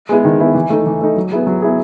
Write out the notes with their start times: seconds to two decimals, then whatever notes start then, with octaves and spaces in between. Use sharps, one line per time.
0.09 G#3 B3 E4 G#4
0.25 D#3
0.39 G#3 B3 E4 G#4
0.55 E3
0.70 A3 D#4
0.86 E3
1.01 A3 D#4
1.16 F#3
1.32 B3 E4 G#4
1.47 F#3
1.62 B3 E4 G#4